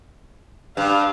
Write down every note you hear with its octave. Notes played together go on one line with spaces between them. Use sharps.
G2 F5